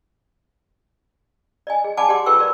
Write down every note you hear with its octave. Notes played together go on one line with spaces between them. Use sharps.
D5 D#5 G#5
G#4
D5 F#5 G#5 A5 B5 D6
G4 G#4 D5 F#5 C6 D6
F4 A4 B4 G5 C#6 E6
F#4 A#4 B4 D5